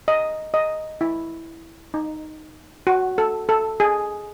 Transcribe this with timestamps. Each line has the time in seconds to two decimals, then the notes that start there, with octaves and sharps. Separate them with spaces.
0.08 D#5
0.54 D#5
1.01 E4
1.94 D#4
2.87 F#4
3.18 A4
3.49 A4
3.80 G#4